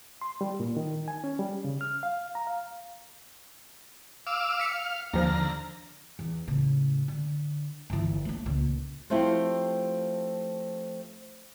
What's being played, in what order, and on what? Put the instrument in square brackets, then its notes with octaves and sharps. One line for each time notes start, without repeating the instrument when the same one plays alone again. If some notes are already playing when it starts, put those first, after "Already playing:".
[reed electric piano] C6
G3
A#2
D#3
G#5
C#4
G3
C#3
F6
F5
A#5
F5
[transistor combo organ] F5 D6 E6
[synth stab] B6 C#7
[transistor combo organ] F5
[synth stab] D#2 F3 F6 [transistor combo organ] D3 A#5
[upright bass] E2
A2 C#3
D3
G1 E3
A3 D4
C#2 A#2
[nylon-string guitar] F3 A3 C4 E4 F4 G4